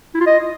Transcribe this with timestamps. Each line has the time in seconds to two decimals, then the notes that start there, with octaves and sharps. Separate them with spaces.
0.14 E4
0.20 F4
0.27 D#5